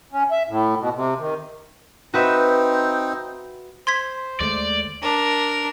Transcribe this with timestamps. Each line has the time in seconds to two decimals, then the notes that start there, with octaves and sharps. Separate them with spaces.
0.12 C#4
0.31 E5
0.48 A2
0.80 B2
0.95 C3
1.19 D#3
2.14 C4 D#4 F#4 B4 E5
3.87 C5 C6 G#6 B6
4.40 D#2 G#3 A3 D5
5.02 D4 A#4